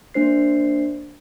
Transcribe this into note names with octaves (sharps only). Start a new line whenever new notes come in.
A#3 D4 C5 C7